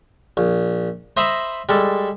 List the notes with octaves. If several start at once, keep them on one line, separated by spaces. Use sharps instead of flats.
A#1
C5 D#5 E5 A#5 B5
G3 G#3 A4